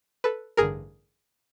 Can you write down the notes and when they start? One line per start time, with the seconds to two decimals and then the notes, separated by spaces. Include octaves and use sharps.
0.24 A4 B4
0.57 A1 G2 D3 G#4 A#4